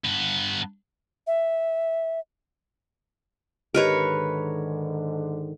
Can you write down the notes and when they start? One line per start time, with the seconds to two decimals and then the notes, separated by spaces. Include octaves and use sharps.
0.04 G2 B3
1.27 E5
3.75 G#2 D3 D#3 G4 A#4 B4 C#5 D#5